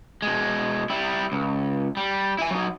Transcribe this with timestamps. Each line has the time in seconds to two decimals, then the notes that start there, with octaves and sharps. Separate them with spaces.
0.22 B2 G#3
0.90 G3 E4
1.32 C#2
1.97 G3
2.39 E4 G#5
2.51 F#3 D#4